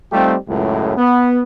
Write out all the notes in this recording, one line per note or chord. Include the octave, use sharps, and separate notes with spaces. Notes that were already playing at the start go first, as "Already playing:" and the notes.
G3 A3 C4 D#4 F4 G4
C#2 F#2 A2
B3